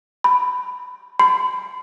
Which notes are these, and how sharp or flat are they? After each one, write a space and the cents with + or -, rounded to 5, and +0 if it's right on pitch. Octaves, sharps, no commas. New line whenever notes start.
B5 +10
B5 +45